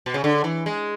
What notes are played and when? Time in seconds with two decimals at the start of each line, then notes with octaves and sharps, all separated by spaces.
0.06 B2
0.14 C#3
0.24 D3
0.44 E3
0.66 G#3